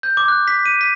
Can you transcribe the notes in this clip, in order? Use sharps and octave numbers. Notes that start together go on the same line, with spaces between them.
G6
D6
F#6
B6
D#7
B6